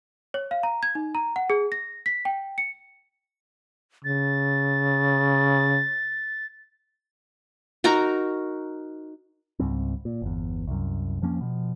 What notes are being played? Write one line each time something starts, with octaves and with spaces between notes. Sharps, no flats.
C#5
F5
A#5
G#6
D#4
A#5
F#5
G#4
A#6
B6
G5
C#7
C#3 A6
D#4 F#4 A#4 A#5
C#2 G#2 G3 C4
A#2
G1 E2
C2 F#2
F2 F3 A#3 C#4
B2 F3